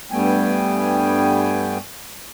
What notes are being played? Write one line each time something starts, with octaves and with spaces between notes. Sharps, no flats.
G2 G3 A3 B3 G5 G#5